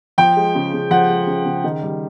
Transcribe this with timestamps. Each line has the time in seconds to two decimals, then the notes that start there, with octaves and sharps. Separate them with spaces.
0.18 F3 G5
0.36 G#3
0.55 C#3
0.73 C#3
0.91 F3 F#5
1.09 G#3
1.27 C#3
1.46 C#3
1.64 D#3
1.82 G3